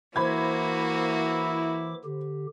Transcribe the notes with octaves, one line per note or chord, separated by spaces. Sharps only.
E3 A#3 E4 F#4 C5 B5 D6 G#6
D3 G4